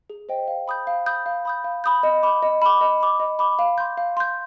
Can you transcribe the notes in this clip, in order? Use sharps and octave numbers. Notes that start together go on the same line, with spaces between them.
G#4
C5 D#5 G5
F5
B5 D#6 G6
F5
B5 D#6 G6
F5
B5 D#6 G6
F5
B5 D#6 G6
D#5
B5 D6
D#5
B5 D6
D#5
B5 D6
D#5
B5 D6
F5
C6 G6
F5
C6 G6